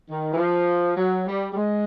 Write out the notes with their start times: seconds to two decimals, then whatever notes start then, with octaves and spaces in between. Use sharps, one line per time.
0.09 D#3
0.32 E3
0.37 F3
0.97 F#3
1.27 G3
1.51 G3
1.55 G#3